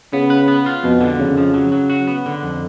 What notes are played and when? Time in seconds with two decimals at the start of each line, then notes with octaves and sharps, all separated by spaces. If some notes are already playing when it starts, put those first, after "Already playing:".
0.13 C#3 B3
0.30 B4
0.48 B3
0.66 F4
0.84 F2 B2
1.01 D3
1.19 F2 C#3
1.37 F3
1.54 F#3
1.72 F#3
1.90 F#4
2.07 B3
2.26 D3
2.43 F2